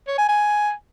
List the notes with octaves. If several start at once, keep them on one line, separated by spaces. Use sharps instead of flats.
C#5
G#5
G#5